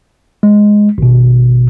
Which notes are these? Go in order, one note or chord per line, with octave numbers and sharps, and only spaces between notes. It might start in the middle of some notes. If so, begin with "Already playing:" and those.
G#3
G#1 B2